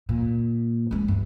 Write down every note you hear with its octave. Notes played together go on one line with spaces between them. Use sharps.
A#2
G#3 C#4
G2